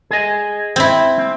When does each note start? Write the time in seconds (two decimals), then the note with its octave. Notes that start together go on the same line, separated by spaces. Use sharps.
0.11 G#4 D#5
0.76 C4 E4
1.18 C4